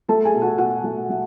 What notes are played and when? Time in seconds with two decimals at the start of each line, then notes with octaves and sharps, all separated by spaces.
0.08 A3 A4 A5
0.25 G#4 G#5
0.34 B2
0.42 F#4 F#5
0.58 B2 F#4 F#5
0.84 A3
1.10 A3